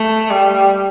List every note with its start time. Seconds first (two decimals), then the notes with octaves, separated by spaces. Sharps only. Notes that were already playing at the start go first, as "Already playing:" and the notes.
Already playing: A3
0.31 G3